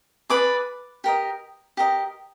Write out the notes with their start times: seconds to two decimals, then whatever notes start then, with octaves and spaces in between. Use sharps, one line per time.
0.30 G#4 B4 D5 D6
1.04 G4 A#4 D#5
1.77 G4 A#4 D#5